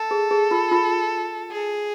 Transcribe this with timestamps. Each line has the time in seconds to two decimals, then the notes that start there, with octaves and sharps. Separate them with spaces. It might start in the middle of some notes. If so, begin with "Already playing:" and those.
Already playing: A4
0.11 G#4
0.31 G#4
0.51 F4
0.71 F4
1.51 G#4